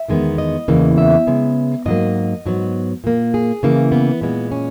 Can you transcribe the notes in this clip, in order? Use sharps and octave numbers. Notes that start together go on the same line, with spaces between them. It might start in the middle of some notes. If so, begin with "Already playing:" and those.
Already playing: E5
E2 D#3 G#3 B3
D#5
E2 C#3 E3 A#3
E5
C#3 G#3 B3
G#2 F#3 A#3 D#5
G#2 F#3 B3
A#2 A#3
G#4
C#3 E3 A#3
B3
A#2 G#3 B3
C#4